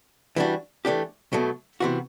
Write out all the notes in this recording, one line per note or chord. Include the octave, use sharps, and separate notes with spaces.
E3 G3 D4 F#4
E3 A3 D4 G4
B2 F#3 A3
C3 E3 B3 F#4